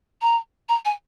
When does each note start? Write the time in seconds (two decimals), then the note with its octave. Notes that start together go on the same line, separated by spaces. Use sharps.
0.22 A#5
0.69 A#5
0.85 G#5